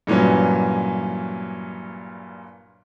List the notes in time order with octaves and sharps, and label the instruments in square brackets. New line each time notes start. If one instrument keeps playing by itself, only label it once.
[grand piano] G2 A#2 E3 F#3 C#4